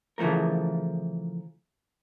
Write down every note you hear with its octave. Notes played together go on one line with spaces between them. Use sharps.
C#3 E3 F3 A3 A#4